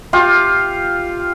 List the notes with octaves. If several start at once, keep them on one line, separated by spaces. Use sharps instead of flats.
F4 G4